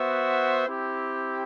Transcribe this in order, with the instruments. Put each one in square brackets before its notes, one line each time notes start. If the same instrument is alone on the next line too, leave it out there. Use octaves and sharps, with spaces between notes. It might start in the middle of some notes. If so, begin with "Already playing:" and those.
Already playing: [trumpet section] B3 F#4 C5 E5
C4 E4 G4